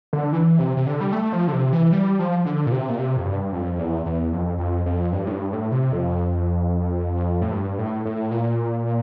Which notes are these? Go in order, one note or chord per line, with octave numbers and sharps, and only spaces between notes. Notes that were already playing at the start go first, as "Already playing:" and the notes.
D3
E3
C3
C3
D3
G3
A3
F3
D3
C3
E3
G3
F3
D3
A#2
C3
A#2
C3
F2
G2
F2
E2
E2
F2
F2
F2
G2
A2
G2
A2
C3
F2
A2
G2
A2
A2
A#2